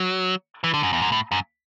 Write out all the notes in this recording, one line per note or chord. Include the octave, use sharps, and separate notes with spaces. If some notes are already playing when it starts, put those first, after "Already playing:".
Already playing: F#3
E3
D3
F#2
E2
F#2
A2
F#2